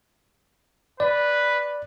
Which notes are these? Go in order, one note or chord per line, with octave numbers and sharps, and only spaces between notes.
B4 D5